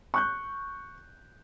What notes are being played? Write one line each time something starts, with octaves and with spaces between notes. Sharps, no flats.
C#6 F#6 G6